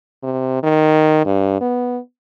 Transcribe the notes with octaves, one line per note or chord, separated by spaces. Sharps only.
C3
D#3
G2
B3